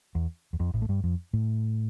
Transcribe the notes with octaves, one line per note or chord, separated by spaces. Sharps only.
E2
E2
F2
A1 A2
A3
G2 G3
F2 F3
A2 A3